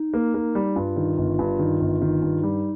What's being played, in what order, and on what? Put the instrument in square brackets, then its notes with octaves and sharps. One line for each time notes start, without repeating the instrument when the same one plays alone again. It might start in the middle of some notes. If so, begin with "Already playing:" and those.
Already playing: [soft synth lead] D#4
[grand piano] A#3
A#3
G3
[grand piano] G2 [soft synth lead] F4
[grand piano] D#3
G1
G2
D#3
G1
D#3
G2
[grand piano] G3 [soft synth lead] D#4